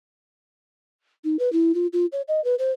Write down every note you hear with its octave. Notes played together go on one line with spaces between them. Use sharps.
D#4
B4
E4
F4
F4
C#5
D#5
B4
C5